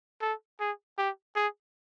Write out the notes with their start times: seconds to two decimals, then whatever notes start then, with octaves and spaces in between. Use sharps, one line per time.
0.22 A4
0.60 G#4
0.99 G4
1.36 G#4